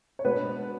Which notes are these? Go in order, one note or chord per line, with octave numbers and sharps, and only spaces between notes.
C#5
B2 G#3 B3 D4 B4